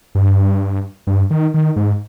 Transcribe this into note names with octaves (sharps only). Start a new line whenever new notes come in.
G2
G2
D#3
D#3
G#2